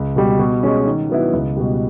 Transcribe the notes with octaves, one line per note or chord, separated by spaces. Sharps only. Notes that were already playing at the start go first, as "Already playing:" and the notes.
Already playing: C#2
B2 G3
B2
G#3 C#4
D#3
F#3 B3 E4
C#2
B2 G3